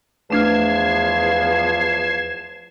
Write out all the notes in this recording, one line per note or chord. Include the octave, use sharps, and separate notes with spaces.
E2 F3 A3 D4 F6 G#6 C7 E7